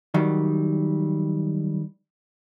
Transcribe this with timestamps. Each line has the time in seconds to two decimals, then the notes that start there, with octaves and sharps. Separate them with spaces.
0.14 D#3 F#3 G3